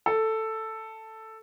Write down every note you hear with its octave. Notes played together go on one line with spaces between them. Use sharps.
A4